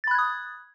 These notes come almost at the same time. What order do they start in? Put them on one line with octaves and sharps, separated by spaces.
A6 B5 F#6 G#6 D#6